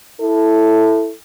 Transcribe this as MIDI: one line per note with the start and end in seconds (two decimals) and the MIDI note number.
0.21 1.12 64
0.21 1.12 69